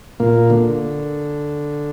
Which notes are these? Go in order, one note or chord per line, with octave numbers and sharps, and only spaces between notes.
A#2 A#3
D3